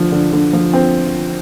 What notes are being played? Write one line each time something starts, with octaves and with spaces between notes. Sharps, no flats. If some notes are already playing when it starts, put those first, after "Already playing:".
Already playing: D3 F3
D3
D3
F3
C4